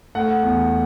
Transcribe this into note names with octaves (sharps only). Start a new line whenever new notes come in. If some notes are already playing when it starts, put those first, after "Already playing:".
A3 F#5
E2